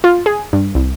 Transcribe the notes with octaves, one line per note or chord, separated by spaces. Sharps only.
F4
G#4
G2
C2